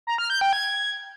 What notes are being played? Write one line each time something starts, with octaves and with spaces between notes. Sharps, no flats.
A#5
F6
G6
G5
G#6